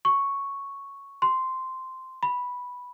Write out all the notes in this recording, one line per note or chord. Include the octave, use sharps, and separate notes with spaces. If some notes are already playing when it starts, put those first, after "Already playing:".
C#6
C6
B5